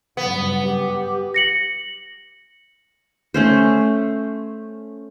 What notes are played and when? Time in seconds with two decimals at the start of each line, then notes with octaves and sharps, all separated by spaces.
0.17 G2 C#3 F#3 B3
0.65 G4
1.34 A#6 C#7 F#7
3.34 A3 C#4 C5